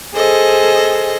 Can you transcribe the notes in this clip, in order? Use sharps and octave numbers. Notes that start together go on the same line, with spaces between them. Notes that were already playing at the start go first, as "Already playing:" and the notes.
G#4 A4 C5 D#5